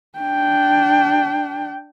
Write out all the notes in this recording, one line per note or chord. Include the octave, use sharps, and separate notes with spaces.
D4 G5